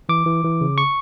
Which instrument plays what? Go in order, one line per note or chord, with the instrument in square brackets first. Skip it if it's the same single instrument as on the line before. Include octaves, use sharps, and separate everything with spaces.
[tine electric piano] E3 D6
E3
E3
C#3
C#6